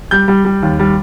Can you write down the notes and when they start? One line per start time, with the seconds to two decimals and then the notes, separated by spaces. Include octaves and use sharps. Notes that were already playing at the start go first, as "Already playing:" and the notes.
0.11 G3 G6
0.28 G3
0.45 G3
0.62 D#2
0.79 G3